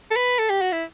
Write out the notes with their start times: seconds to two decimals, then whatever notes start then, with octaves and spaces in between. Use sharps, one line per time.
0.11 A4
0.16 B4
0.39 A4
0.50 G4
0.61 F#4
0.72 E4